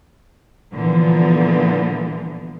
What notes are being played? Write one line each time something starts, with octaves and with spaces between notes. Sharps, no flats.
A#2 D3 E3 F3 G3 B3